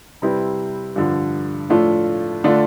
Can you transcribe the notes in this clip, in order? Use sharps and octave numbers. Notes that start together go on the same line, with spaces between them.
C3 G3 C4 E4 B4
G2 D3 F3
A2 F3 A3 D4 F4
D3 A3 D4 F4